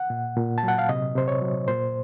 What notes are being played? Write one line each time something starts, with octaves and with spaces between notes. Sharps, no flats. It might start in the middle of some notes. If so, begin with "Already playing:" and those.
Already playing: F#5
A#2
A#2
A5
F#3
F#5
F5
C3 D#5
C3 C5
C#5
F#3
A#2 C5